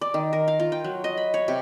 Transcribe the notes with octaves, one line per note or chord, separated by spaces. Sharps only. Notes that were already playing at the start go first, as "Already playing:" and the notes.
D5
D#3
A#4
F5
F4
G5
F#3
D#5
B5
C#5
C3